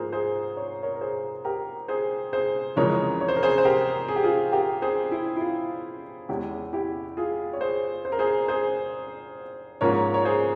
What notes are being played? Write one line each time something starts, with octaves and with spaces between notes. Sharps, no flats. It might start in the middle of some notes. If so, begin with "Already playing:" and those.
Already playing: G#2 F3 A#3 G#4 A#4 C5
G#4 C5
C#5
A#4 C#5
A#4
G#4 C5
G4 A#4
G#4 C5
G#4 C5
F2 C#3 E3 G#3 A#4 C#5
C#5
C5
A#4
G#4 C5
C5
G4 A#4
G#4
G4
F4 G#4
G4 A#4
G#4 C5
E4
E4
F4
E2 E3 G#3 C#4 E4 G4
E4 G4
F4 G#4
C#5
G#4 C5
C5
A#4
G#4 C5
G#4 C5
G#2 F3 A#3 C#4 A#4 C#5
C#5
G#4 C5